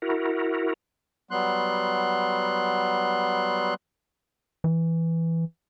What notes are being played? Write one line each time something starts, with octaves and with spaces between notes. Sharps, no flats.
E4 F#4 A#4
F#3 G3 B3 C6 F#6
E3